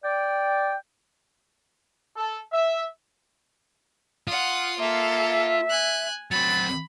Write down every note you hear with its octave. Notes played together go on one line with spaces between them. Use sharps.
D5 G5
A4
E5
F4 F#5 D#6
A#3 A4 E5
G#5 F#6
F#3 C4 B5 A6